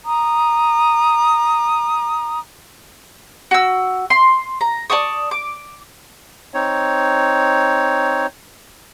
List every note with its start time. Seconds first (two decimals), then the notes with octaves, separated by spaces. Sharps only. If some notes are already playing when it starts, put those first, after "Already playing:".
0.06 A#5 D#6
3.51 F#4 E6
4.10 C6
4.61 A#5
4.90 D5 A5 C#6 D#6
5.31 D6
6.54 C4 D#4 C#5